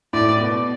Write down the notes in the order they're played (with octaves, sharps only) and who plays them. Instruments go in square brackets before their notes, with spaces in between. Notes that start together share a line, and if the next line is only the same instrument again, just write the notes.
[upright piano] A2 [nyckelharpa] D5
[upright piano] B2